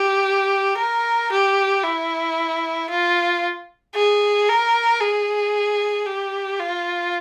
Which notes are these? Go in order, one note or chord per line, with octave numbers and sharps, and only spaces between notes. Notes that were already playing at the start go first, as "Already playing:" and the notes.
Already playing: G4
A#4
G4
E4
F4
G#4
A#4
G#4
G4
F4